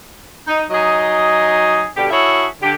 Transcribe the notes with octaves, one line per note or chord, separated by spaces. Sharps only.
D#4
F#3 D#4 G#4 D#5
B2 D3 G3 G4
E4 F#4 G#4 A4 C#5 E5
D3 G4